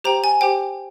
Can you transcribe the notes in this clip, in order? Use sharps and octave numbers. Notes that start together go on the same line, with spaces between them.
G4 C5 G5 A#5
G#5
G4 C5 G5